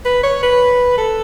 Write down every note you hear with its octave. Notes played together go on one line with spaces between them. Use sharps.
B4
C#5
B4
A4